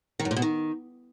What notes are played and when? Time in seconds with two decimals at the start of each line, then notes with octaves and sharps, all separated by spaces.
0.20 D#3
0.25 F#2
0.31 A#2
0.36 B2
0.42 D#3